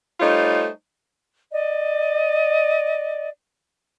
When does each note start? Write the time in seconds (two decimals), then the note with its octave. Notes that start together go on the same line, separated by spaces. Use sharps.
0.20 G3 A3 D#4 F4 C5 C#5
1.51 D5 D#5